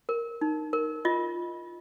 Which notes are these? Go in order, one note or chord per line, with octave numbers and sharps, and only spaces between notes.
A#4
D#4
A#4
F4 D#5